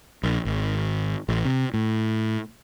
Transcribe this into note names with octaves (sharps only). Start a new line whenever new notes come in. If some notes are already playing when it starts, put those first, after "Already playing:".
A#1
G#1
A1
C3
A2